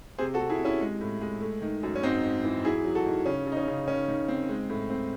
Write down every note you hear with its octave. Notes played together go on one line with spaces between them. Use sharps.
C3 G#4 C5
F#4 A4
C3
E4 G#4
C3
C#4 E4
G#3
A2
G#3
A3
D#3
F#2
C#4
G#2 C4 D#4
G#2
E3
F#3 E4 G#4
F#3
F#4 A4
D#3
C#3 C#4
C#3 D#4
C#4
C#3
D#3 C#4
D#3
C4
G#3
A2
C4